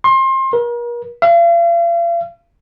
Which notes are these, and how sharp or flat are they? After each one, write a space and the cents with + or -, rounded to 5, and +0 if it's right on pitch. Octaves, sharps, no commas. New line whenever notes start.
C6 +30
A#4 +40
F5 -40